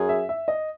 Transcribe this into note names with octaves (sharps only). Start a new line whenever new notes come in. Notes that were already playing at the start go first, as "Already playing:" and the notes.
Already playing: F#2 G#4
E5
E5
D#5